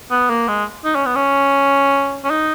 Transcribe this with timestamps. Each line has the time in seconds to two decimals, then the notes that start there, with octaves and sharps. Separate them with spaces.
0.11 B3
0.30 A#3
0.48 G#3
0.84 D#4
0.95 C#4
1.06 B3
1.16 C#4
2.24 C#4
2.31 D#4